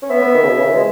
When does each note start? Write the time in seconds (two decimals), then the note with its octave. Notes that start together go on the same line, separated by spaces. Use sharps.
0.02 C#4
0.10 B3 E5
0.22 B3
0.34 D#3
0.43 C#3
0.47 B2
0.56 C#3
0.66 E3
0.75 G#3